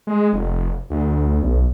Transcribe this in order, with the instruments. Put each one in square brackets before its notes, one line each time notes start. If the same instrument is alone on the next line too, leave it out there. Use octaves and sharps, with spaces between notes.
[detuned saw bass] G#3
F1
D2
B1